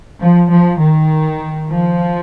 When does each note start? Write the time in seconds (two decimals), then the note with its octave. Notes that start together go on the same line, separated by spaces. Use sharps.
0.20 F3
0.49 F3
0.81 D#3
1.70 F3